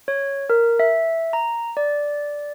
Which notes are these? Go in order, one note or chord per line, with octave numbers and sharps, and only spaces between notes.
C#5
A#4
E5
A#5
D5